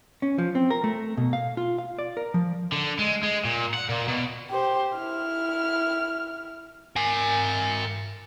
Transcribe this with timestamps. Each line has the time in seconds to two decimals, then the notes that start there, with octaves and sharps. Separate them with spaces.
0.22 C#4
0.38 F3
0.55 C4
0.71 A#4
0.84 A3
1.17 B2
1.33 F5
1.57 F4
1.79 F5
1.99 D5
2.17 A#4
2.34 F3
2.72 D3
2.99 G#3
3.23 G#3
3.45 A#2
3.74 F#5
3.89 A#2
4.08 B2
4.51 G4 C5
4.94 E4 F6
6.96 A#4 G#5